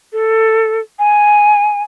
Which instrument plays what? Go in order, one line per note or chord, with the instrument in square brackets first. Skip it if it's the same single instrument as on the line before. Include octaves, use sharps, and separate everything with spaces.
[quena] A4
G#5